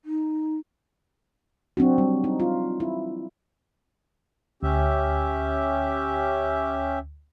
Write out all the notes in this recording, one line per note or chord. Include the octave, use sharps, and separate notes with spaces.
D#4
F#3 C4 D4 F#4
G3
D#4
F4
E4
D2 C#4 G4 E5